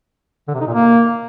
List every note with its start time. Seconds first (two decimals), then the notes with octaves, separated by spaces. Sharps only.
0.48 D3
0.54 C3
0.61 D#4
0.67 A#2
0.74 A#3